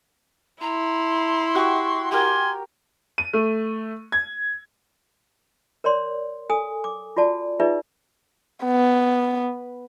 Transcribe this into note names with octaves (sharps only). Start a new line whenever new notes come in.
E4 A#5 C6
F#4 G4 F#5 C#6
G4 A#4 G#5 C6
D#7
A3
G#6
A#4 C#5 D5 C6
A4 G#5 D#6
D6
F4 F#4 D5 A5
D#4 F4 G#4 B4 D5 E5
B3